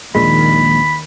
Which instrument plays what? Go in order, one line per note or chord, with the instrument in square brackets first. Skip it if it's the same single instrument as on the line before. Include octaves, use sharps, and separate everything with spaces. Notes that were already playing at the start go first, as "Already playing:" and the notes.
[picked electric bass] A#1 A#2 G#3 [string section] D#2 D#3 [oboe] B5